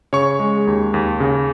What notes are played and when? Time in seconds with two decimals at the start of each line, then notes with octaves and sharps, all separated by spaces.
0.13 C#3 C#5 C#6
0.39 G#3
0.67 D#2
0.94 D#2
1.20 C#3